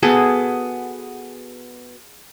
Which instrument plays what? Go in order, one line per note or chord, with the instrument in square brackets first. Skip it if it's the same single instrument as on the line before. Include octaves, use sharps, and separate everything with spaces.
[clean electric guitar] B3 F#4 A4 [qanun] G#4